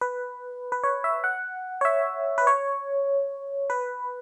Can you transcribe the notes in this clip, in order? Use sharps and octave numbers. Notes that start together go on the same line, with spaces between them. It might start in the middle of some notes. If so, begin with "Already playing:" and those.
B4
B4
C#5
E5
F#5
C#5
E5
B4
C#5
B4